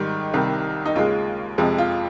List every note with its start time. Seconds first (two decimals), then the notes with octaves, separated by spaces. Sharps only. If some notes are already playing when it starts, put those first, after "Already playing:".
Already playing: G#2 D#3 G3 G4
0.34 C2 C3 D#3 G3
0.86 D#4
0.95 D#2 C#3 G#3 F4
1.58 F2 C3 F3 G#3
1.78 F4